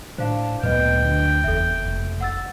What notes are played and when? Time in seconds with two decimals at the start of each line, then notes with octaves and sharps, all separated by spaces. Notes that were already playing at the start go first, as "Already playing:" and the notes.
0.18 A2 D4 C5 F5
0.63 D2 A#2 F#3 B3 B4 D#5 G5
1.05 D3 D4
1.44 F#1 E2 A4 E5
1.84 F1
2.21 F#5 E6 A6